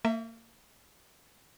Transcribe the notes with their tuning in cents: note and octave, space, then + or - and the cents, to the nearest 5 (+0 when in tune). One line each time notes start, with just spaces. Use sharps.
A#3 -35 E5 +0